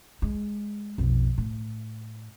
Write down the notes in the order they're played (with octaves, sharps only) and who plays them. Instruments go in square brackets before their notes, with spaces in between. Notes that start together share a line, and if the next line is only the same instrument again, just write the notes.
[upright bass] G#3
B1 F2
A2